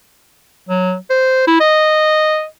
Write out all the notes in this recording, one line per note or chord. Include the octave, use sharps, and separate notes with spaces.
F#3
C5
E4
D#5